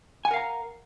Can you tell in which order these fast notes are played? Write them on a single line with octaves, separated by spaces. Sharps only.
G#5 F#5 A#4 F5 A#5